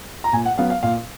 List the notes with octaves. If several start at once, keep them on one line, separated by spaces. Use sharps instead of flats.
A#5
A#2 G#5
F#5
F#3 B3 F5
F5
A#2 F5